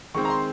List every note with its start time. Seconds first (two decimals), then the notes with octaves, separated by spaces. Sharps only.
0.14 D#3 G#3 C4 C#6
0.25 A#5
0.30 C6